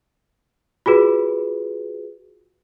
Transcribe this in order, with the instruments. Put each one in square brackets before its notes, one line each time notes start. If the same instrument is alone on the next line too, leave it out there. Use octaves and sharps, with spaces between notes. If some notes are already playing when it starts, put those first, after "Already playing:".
[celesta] F4 F#4 G#4 B4